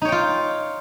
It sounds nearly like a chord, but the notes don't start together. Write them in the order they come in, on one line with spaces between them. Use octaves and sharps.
D#4 C#5 G5 F4